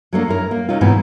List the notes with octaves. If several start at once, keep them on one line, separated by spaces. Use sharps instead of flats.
F#3 A3 A#3 D4
F#2 E4 A#4
A#3
C3 C#4 D#4 F4
G#2 B2 E3 B3 C4